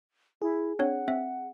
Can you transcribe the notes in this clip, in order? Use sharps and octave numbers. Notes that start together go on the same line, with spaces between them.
E4 G#4
C4 D4 C#5 F#5
C4 E5